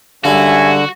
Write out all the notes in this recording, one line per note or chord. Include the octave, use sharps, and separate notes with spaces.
G2 D3 G#3 C#4 D#4 F#4 E5 G#5